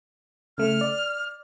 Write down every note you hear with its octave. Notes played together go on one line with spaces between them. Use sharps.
C#3 A3 F6
D5